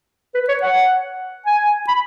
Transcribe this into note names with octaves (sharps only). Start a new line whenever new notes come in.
B4
C#5
F#5
G#5
B5